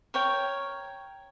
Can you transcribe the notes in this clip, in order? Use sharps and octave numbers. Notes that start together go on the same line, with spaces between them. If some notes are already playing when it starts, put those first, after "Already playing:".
A#4 C#5 G5